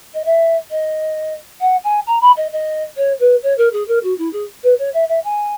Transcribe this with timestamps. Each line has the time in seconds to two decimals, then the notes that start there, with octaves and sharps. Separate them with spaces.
0.13 D#5
0.25 E5
0.70 D#5
1.60 F#5
1.84 G#5
2.06 A#5
2.21 B5
2.36 D#5
2.52 D#5
2.96 C#5
3.19 B4
3.42 C#5
3.57 A#4
3.72 G#4
3.88 A#4
4.03 F#4
4.18 E4
4.33 G#4
4.63 B4
4.78 C#5
4.93 E5
5.08 E5
5.24 G#5